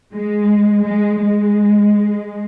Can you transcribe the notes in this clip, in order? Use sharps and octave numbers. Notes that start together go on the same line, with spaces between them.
G#3
G#3
G#3